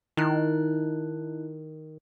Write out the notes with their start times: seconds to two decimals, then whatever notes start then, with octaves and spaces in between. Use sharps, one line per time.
0.17 D#3 D#4 E4 F#6